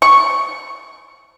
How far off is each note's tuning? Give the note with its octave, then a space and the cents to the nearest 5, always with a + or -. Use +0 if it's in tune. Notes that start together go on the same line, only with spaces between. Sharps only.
C#6 -5